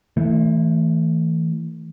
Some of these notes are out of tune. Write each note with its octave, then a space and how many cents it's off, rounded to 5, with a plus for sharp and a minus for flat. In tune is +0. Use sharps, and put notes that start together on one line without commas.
E3 -20 A3 +20